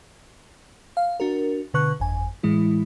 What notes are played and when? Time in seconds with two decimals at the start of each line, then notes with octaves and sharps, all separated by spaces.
0.97 F5
1.20 D4 F#4 A#4
1.74 B2 D3 B4 C#6 F#6
2.00 G1 F2 G#5
2.43 A2 E3 G#3 E4